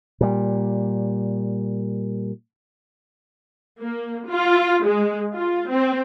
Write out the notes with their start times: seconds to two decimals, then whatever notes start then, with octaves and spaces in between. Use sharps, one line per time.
0.21 A#2 G3
3.81 A#3
4.29 F4
4.84 G#3
5.35 F4
5.68 C4